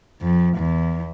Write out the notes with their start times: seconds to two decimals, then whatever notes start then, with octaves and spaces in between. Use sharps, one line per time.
0.21 F2
0.57 E2